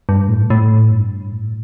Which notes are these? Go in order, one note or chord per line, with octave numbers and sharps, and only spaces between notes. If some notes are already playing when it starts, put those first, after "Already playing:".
G2
A2
A2
G2
A2